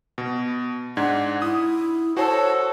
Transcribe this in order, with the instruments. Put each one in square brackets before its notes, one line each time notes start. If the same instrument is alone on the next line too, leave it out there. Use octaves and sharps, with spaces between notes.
[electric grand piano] B2
[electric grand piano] G#2 D4 G#6 [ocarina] F#5
[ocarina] E4 [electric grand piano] D#6
[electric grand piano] F#4 C5 [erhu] A4 [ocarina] C#5